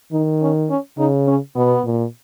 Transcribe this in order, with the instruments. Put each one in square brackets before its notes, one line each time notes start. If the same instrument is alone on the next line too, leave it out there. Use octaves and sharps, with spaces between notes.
[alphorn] D#3 [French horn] D#4
[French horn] C#4
C#4
[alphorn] C#3 [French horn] D#4
[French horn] C#4
[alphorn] B2 [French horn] B3
[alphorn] A#2